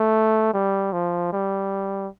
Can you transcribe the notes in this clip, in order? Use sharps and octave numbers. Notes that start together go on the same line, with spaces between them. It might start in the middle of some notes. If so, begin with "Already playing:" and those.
Already playing: A3
G3
F3
G3